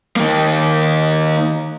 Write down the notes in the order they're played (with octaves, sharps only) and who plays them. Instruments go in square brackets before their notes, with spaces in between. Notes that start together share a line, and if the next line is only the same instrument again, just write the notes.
[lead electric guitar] D#3 A#3